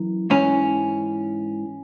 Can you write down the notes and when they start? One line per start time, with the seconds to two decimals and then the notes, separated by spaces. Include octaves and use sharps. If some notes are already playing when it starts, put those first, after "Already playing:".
Already playing: F#2 E3
0.30 G#2 E3 C#4